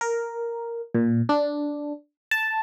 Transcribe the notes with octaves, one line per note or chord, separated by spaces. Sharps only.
A#4
A#2
D4
A5